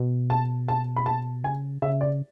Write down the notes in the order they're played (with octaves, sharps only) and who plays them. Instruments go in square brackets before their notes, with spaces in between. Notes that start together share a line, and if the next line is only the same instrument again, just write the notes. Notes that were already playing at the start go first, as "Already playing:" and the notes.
Already playing: [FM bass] B2
[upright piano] A5
A5
B5
A5
[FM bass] C#3 [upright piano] G#5
[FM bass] C#3 [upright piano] E5
[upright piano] D5